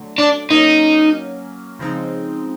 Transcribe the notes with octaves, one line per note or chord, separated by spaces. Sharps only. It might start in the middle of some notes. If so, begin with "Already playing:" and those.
Already playing: D3 F#3 A3
D4
F#3 A#3 C#4 D#4
C#3 F3 G#3 C4 D#4